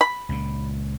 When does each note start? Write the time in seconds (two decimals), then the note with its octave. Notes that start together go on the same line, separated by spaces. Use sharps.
0.01 B5
0.29 C#2 A#2